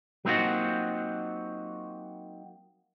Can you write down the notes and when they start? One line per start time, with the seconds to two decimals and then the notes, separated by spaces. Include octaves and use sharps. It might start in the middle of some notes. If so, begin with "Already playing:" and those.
0.25 F#3 A#3 C4 D#4 F4 F#4